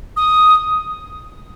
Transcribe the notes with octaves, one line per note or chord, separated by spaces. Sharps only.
D#6